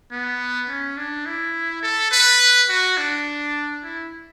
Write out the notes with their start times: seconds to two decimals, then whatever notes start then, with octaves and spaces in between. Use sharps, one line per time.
0.11 B3
0.68 C#4
0.97 D4
1.26 E4
1.83 A4
2.12 B4
2.69 F#4
2.98 D4
3.83 E4